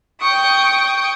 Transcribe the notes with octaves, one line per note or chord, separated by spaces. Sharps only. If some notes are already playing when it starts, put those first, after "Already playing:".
G5 C#6 D#6